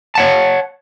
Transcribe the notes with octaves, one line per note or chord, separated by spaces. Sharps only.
C#5 F#5 A5